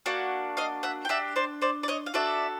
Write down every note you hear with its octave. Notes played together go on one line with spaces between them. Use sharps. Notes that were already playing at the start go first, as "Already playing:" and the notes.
A#3 D4 F#4
D#5 F5
E5 F#5
G5
D4 G4 E5 F#5
C5 D5
C5 D5
D5
C#5 D#5
F5
D4 F#4 A4 D5 E5